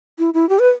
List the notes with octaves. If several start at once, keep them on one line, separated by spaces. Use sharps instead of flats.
E4
E4
G4
B4